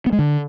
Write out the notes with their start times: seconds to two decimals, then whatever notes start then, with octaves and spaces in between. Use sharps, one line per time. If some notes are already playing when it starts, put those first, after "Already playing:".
0.06 B3
0.13 G#3
0.19 D3